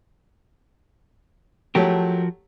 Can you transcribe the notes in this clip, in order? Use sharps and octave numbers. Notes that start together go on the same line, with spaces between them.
F3 F#3 A3 F#4 G4 A#4